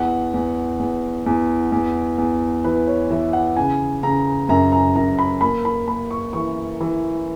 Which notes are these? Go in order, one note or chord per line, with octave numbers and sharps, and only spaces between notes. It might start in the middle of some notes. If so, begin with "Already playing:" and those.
Already playing: E2 F#5
E2
E2
E2
E2
E2
E3 B4
C#5
E3 E5
F#5
C#3 G#5
C#3 A#5
F#2 A#5
A#5
F#2 A#5
B5
A#3 B5
B5
A#3 B5
C#6
E3 C#6
E3